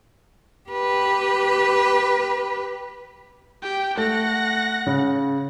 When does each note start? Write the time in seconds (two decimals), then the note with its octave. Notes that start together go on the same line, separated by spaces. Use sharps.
0.70 G4 B4
3.62 G4 G5
3.97 A3 F#5 A#6
4.87 C#3